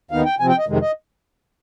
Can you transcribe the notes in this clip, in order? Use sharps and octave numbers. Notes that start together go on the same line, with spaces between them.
D#2 D#3 B3 D#4 F5
G5
C3 F3 C4 G#5
G5
D#5
F2 C3 D#3 G#3
D#5